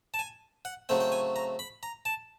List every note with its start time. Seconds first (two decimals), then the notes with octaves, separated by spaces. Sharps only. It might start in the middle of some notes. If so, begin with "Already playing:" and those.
0.14 A5
0.19 G#5
0.65 F#5
0.89 C#3 F#3 A3 C4 G5
1.00 G5
1.12 G#5
1.36 A#5
1.59 B5
1.83 A#5
2.05 A5